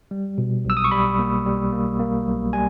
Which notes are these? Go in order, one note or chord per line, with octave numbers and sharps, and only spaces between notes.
G3
B2
B1 E6
D#6
C#6
G3 B5
A#3
G3
A#3
A#3
B1
G3 G#5